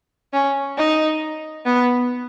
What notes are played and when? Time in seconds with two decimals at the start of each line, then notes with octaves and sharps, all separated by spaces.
0.33 C#4
0.77 D#4
1.66 B3